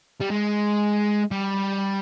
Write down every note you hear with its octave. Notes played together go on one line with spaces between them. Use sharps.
G3
G#3
G3